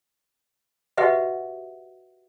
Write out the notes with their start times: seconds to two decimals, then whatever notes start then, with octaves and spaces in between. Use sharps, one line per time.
0.97 F#4 G4 B4 D#5 E5 F#5